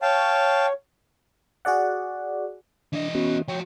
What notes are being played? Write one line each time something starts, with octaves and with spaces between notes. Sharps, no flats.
C#5 F5 G5 A5
F#4 G#4 D5 F#5
E3 D4 D#5
B3 C#4 F#4
F3 F#4 C#5 G5